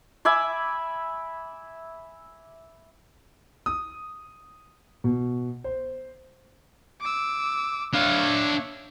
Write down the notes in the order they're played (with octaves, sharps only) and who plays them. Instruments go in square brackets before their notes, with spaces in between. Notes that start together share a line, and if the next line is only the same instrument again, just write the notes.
[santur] E5 G#5 B5 D6
[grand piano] D#6
B2
C5
[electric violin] D6 E6
[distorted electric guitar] D4 F5 [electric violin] C#5 E5